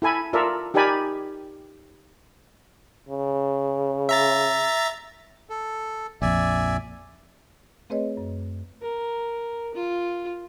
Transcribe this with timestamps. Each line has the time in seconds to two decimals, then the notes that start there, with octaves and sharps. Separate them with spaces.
0.02 E4 A4 G#5 B5
0.33 F4 A4 A#4 D5 E5
0.74 D#4 G4 A#4 D5 G#5 B5
3.09 C#3
4.09 E5 A#5 A6
5.50 A4
6.22 A#1 F2 D5 E5 G#5
7.90 A3 C4 G#4 B4 C#5 D#5
8.17 F#2
8.82 A#4
9.74 F4